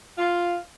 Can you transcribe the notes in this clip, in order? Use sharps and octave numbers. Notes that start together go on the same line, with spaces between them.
F4